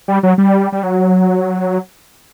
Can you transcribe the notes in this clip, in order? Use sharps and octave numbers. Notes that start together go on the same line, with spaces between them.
G3
F#3
G3
G3
F#3